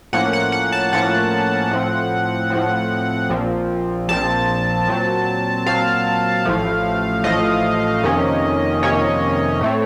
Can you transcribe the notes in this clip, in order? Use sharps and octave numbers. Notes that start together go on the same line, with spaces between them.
A2 F3 A#3 C#4 F#5
F#5
F#5
A5
A2 F3 A#3 C#4 F#5
A2 F3 C4
A2 F3 C4
A#1 A#2 F3 C4
A#1 A#2 F3 C4 A5
A#2 F#3 C4
A#2 F#3 C4 F5
A1 A2 F3 A3
A1 A2 F3 A3 D#5
F2 C3 D#3 A#3 C#4
F2 C3 D#3 A#3 C#4 C#5
A2 A3 C4